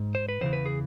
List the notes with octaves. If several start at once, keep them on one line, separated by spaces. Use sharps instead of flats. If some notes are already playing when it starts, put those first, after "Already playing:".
Already playing: G#2
C5
B4
E2 C#3 E3 C5
B4
G#4